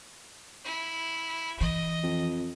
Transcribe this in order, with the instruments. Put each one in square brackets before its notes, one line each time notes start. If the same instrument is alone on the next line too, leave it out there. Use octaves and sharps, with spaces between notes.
[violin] E4
[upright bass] E3 [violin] D#5
[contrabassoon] F2